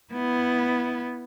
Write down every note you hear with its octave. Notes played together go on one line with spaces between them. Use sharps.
B3 E4